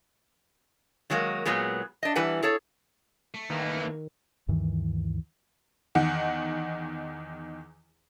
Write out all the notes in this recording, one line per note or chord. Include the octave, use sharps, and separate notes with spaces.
D#3 F#3 G#3 A#3
A#2 F#3 G#3 B3 G#4
D4 D#5
E3 G3 B4 F#5 G#5
G#4 A4 C#5
A3
D#3 E3 A#3
D2 G2 D#3 E3
E2 D#3 F#5